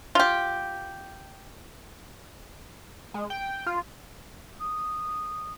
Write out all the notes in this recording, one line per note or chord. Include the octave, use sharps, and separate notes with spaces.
F4 G4
G#3
G5
F4
D#6